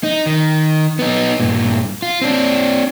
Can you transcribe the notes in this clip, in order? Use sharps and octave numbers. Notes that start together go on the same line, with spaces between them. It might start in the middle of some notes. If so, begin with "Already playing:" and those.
D#4
D#3
B3 D#4
G2 A#2
F4
C4 D4